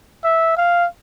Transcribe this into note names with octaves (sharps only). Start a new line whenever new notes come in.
E5
F5